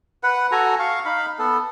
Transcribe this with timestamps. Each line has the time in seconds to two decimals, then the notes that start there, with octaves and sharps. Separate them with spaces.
0.23 B4 F#5
0.52 F#4 A4 G#5 A#5
0.79 F5 C#6
1.05 D#4 F5 B5
1.39 B3 A4